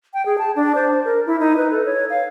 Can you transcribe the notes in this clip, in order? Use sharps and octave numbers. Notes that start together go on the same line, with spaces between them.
G5
G#4
A5
D4
C5
A#4
E4
D#4
B4
A4
C#5
F5